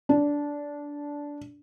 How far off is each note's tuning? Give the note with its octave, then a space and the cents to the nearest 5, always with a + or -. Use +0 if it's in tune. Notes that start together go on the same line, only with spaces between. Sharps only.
D4 -15